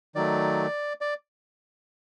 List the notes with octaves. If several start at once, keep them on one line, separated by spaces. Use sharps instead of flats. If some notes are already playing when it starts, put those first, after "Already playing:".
D#3 F#3 A3 D5
D5